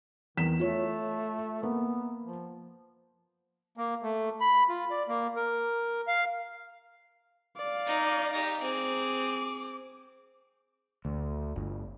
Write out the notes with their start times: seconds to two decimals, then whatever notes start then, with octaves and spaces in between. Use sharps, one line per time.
0.37 E2 D#3 B6 E7
0.60 A3 F4 C#5
1.63 A#3 B3
2.24 F3
3.77 A#3
4.03 A3
4.41 B5
4.69 F4
4.90 D5
5.08 A#3
5.36 A#4
6.07 F5
7.57 D5 F5
7.86 D#4
8.32 D#4 G4
8.62 C4 G#4 D6
11.05 D2
11.56 G1